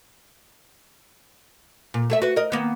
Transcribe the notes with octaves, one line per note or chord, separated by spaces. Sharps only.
A#2
A3 G#4 E5
F#4 B4
A#4 D#5
D#3 A#3 B3